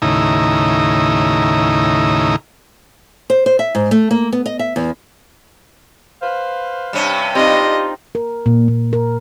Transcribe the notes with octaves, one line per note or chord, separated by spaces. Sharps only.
D#2 A2 C#3 D#4 E4 A#5
C5
C5
E5
G#2
A3
A#3
B3
D#5
E5
E2
B4 C5 F5
G2 C3 C#4
C4 D4 D#4 F4 G4 D#5
A#4
A#2
A#2
A#4